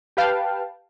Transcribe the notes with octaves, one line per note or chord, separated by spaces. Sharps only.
G4 B4 F5 G5 A5